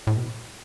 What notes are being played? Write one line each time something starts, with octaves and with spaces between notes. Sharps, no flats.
A2
B2